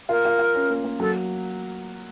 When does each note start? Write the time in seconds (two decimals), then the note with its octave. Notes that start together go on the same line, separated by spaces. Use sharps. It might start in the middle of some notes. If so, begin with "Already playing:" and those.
0.09 F4 A#4
0.25 F4
0.39 F4
0.55 C#4
0.70 A#3
0.84 A#3
1.00 F#3 A4